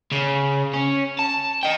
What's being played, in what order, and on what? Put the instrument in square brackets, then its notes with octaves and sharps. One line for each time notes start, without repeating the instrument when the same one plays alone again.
[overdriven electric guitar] C#3
C#4
A5
D#5 G5